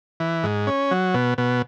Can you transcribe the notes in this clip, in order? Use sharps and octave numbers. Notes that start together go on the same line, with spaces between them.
E3
G#2
C#4
F#3
B2
B2